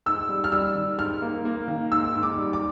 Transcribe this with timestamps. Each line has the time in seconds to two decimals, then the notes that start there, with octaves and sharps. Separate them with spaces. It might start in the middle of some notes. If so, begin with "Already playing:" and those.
0.06 G#2 E6
0.29 G3
0.44 F6
0.52 G3 E6
0.75 D#3
0.98 G#2 F6
1.22 A#3
1.45 A#3
1.68 D#3
1.91 G#2 E6
2.15 G#2
2.23 D6
2.37 G3
2.53 D6